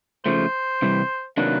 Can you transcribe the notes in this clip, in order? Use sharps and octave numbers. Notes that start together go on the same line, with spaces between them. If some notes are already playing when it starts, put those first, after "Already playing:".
C#3 F3 A3 C5
C3 E3 G3
C3 D#3 F#3 A#3 D4 B4